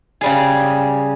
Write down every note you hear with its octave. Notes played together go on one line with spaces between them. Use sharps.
C#3 G3 G#4